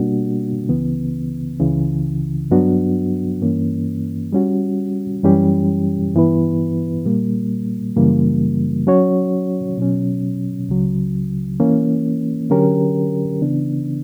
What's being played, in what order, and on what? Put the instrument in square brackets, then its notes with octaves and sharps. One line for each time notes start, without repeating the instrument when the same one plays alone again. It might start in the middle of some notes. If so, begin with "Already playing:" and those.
Already playing: [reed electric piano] B2 G3 A#3 D4 F#4
C#2 C#3 E3 B3
C#2 C#3 E3
G2 F#3 B3 D4 F#4
G2 E3 A#3 C#4
G3 C#4 F#4
F#2 E3 G3 C#4 G4
G2 E3 B3 E4 B4
A#2 G3 A#3
F#2 C#3 E3 G3 A#3
F#3 C#4 F#4 C#5
B2 F#3 C#4
C#2 C#3 F#3
E3 A#3 C#4
D3 F#3 C#4 G4 A#4
C#3 E3 B3 D4